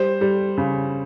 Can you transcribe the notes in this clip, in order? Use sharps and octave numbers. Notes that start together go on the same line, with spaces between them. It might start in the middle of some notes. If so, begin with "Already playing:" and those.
Already playing: G3 C5
G3
C#3